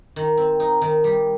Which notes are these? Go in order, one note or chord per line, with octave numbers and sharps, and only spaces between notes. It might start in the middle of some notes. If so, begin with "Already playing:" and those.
D#3
C4
D#4
D#3
G3